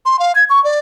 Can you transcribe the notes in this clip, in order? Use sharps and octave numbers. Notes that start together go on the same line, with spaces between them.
C6
F5
G#6
C#6
D5